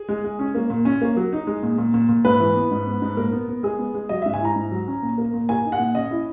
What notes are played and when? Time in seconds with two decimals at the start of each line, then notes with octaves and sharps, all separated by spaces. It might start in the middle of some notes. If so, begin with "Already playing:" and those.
Already playing: G#4
0.09 G#3
0.24 G#3
0.39 C#4
0.55 A#3
0.70 A#2
0.85 C#4
1.02 A#3
1.17 F#3
1.32 D#4
1.47 G#3
1.63 A#2
1.78 A#2
1.94 A#2
2.09 A#2
2.25 G#2 B4
2.40 E3
2.56 B3
2.71 G#2
2.86 B3
3.02 G#2
3.17 A#2 A#4
3.32 B3
3.48 B3
3.63 G#3 G#4
3.79 B3
3.94 G#3
4.09 F#3 D#5
4.22 G#2 E5
4.34 G#5
4.41 E4 A#5
4.56 G#2
4.71 F#3
4.87 C#4
5.03 A#2
5.18 A#3
5.33 A#2
5.49 A#3 G#5
5.65 D#4
5.72 F#5
5.80 A#2
5.95 C#4 D#5
6.11 E4